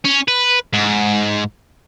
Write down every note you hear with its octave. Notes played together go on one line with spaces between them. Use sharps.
C#4
B4
G#2